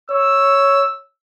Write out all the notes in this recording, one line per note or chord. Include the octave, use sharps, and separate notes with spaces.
C#5 E6